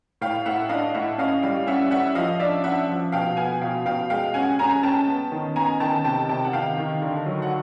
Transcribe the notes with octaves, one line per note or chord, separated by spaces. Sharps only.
A2 F5 G5
A2 E5 F#5
D4 D#5 F5
A2 E5 F#5
C#4 D#5 F5
G3 F5 G5
C#4 E5 F#5
C#4 E5 F#5
F3 D#5 F5
D4 D5 E5
D4 E5 F#5
F3
B2 F5 G5
B3 F#5 G#5
B2 F5 G5
B2 F5 G5
G#3 F5 G5
C#4 F#5 G#5
C#4 G#5 A#5
C#4 G5 A5
B3
D#3
B3 G#5 A#5
D#3 G5 A5
C3 G5 A5
C3 G5 A5
F#5
D#3 F5 G5
D#3
D3
F#3
F#5